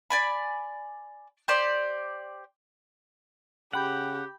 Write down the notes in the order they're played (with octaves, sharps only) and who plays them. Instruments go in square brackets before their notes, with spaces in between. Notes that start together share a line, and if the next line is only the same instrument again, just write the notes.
[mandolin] D5 G#5 B5
G4 C5 D5
[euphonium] C#3 [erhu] G4 [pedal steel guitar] F#5 [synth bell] G5 B5 G6